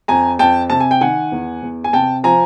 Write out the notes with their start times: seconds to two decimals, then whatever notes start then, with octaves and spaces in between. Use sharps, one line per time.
0.08 F2 G#5 A#5
0.39 F2 G5 A5
0.70 C3 A5
0.80 G#5
0.91 G5
1.01 D#3 F#5 G#5
1.32 E2
1.62 E2
1.84 G#5
1.93 C3 G5 A5
2.24 F3 G#5 A#5